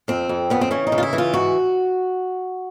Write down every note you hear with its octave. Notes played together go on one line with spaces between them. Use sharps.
F2 C4
F2
C#3 B3
C4
E3 C#4
D#4
C#3
F4
E4
E3
F4
G#2 F#4